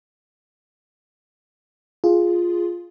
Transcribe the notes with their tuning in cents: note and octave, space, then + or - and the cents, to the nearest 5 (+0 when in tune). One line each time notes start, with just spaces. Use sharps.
F4 +0 G#4 +0